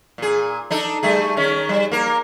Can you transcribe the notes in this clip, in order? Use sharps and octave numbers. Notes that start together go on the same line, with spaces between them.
A#2 G#4
D4 D#4 A4
G3 A3 G#4
D#3 C#4
G3
A#3 A#4